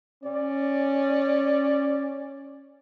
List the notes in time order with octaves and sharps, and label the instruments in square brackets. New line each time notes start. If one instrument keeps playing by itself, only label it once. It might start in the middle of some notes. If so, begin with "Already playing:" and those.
[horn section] C#4 D5